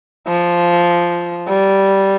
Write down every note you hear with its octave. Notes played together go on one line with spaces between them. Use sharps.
F3
G3